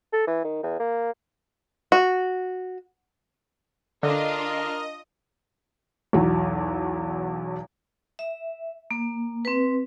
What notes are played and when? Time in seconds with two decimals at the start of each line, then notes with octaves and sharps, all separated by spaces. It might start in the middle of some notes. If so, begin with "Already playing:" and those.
0.13 A4
0.27 E3
0.44 D#3
0.63 E2
0.80 A#3
1.92 F#4
4.03 D3 D4 F4 A#4 D#5
6.13 B1 E2 F#3
8.19 E5
8.91 A#3
9.45 C4 B4